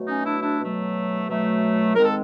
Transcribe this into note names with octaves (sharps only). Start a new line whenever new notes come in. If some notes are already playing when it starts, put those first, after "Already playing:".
Already playing: B2 F#3 A3
C#4 D#4
D4 E4
D4 E4
B2 F#3 A3
B2 F#3 A3
G#2 D#3 G#3 C4 A#4
A4